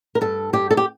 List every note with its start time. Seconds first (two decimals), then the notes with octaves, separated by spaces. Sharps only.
0.15 A#4
0.21 G2 A4
0.53 G2 G4
0.71 A4
0.77 G4